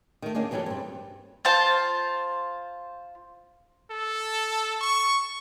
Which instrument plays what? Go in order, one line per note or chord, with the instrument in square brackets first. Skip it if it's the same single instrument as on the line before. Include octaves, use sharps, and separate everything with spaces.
[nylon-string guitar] D#3 A3
D#3 A#3 C#4 D4 G#4
G2 E3 F#3 G3 D4 A4
G2 C4
[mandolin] F4 C5 A5
[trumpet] A4
C#6